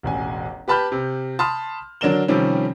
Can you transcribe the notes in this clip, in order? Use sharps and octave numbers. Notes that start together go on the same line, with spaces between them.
E1 A1 G#5
G4 B4 A5 B5 F6 G6
C3
A5 B5 C6 D#6 F6
D3 F#3 D4 A#4 E7 G7
C3 D#3 F3 G3 C#4